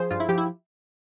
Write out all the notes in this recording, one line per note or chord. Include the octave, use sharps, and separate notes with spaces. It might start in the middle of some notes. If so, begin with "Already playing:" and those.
Already playing: F3 G#4 C5
G2 F4
E4
F3 G4
E4